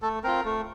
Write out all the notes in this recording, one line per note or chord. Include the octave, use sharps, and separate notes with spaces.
A3 A4
C4 F4 A#4
A3